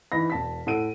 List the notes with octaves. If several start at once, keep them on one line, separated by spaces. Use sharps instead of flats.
E3 D#4 B5 A#6
E1 A5 B6
A2 A4 F#5 D7 D#7